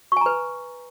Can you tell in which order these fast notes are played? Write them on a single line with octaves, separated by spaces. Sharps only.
C#6 G#5 A#5 B4